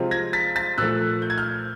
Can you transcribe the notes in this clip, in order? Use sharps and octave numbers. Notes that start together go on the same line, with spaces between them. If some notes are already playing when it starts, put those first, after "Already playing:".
Already playing: C3 F3 G#3 C4 F4
G#6 A#6
A6 B6
A6 B6
A#2 F3 A3 E6 F#6
G6
G#6
F6 G6